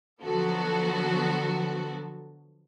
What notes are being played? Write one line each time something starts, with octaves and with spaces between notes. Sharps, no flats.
D3 F3 F#3 B3 F#4 A4